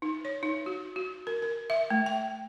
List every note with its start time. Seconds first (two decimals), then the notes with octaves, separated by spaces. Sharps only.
0.02 D#4
0.25 C#5
0.43 D#4
0.66 F#4
0.96 F#4
1.27 A#4
1.42 A#4
1.70 E5
1.90 A3
2.06 G5